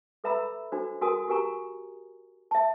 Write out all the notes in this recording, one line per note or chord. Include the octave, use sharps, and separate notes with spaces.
A4 B4 E5 A#5 B5 E6
D4 F#4 A4 C5
F#4 G#4 A#4 G#5 C6 D#6
F#4 G4 A#4 G#5 A#5 C#6
E5 A5